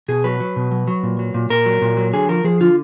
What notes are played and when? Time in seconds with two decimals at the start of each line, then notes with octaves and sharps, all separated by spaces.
0.08 B2 G#4
0.24 F#3 B4
0.40 F#3
0.56 B2
0.71 F#3
0.87 F#3
1.03 A#2
1.19 F#3
1.34 A#2
1.50 A#2 A#4
1.66 F#3
1.82 A#2
1.97 F#3
2.13 D3 G#4
2.29 F3 A#4
2.44 F3 G#4
2.61 D3 F4